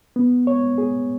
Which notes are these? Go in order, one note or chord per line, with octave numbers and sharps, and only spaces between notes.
B3
C#5
G#4